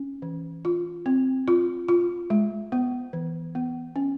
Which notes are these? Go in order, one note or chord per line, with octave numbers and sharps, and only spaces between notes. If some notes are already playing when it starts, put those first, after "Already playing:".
Already playing: C#4
E3
F4
C4
F4
F4
G#3
B3
E3
B3
C#4